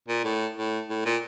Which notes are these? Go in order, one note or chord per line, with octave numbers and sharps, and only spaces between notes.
A#2
A2
A2
A2
A#2